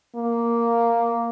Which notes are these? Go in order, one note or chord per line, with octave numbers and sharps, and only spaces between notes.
A#3